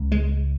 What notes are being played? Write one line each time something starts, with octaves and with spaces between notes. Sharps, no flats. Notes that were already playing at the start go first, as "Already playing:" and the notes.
Already playing: C#2 C#3
G#3